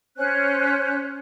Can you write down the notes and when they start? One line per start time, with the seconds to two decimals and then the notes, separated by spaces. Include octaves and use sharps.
0.16 C#4 C5 F#6